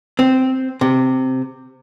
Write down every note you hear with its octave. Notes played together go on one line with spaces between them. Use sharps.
C4
C3